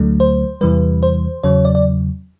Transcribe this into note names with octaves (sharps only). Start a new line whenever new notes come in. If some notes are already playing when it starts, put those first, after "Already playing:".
Already playing: D2 D3 F#3 A3
C5
E2 C3 E3 G3 B4
C5
E2 C#3 F#3 C#5
D5
D5